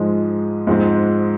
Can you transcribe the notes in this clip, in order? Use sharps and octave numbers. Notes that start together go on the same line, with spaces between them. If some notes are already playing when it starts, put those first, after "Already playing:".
Already playing: G#2 F3 G#3
G#2 F3 G#3 C4